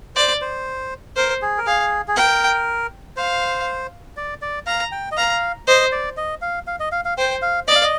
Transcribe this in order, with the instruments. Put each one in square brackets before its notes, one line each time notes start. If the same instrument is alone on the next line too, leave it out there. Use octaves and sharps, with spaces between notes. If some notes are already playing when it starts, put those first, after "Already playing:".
[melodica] C5 [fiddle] D5
[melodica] C5
[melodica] A#4 [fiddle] C5
[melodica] G#4
A#4
[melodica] G#4 [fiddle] F5
[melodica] G#4
[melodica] A#4 [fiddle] G5
[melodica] C5 [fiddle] F5
[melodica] D5
D5
[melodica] F5 [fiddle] A#5
[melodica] G5
D#5
[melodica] F5 [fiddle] A#5
[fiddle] C5 [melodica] D#5
[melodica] D5
D#5
F5
F5
D#5
F5
F5
[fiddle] C5 [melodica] G5
[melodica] F5
[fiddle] D5 [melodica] D#5
[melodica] F5
D#5